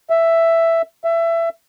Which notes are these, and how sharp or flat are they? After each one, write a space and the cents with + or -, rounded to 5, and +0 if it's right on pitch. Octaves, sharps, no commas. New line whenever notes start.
E5 +5
E5 +20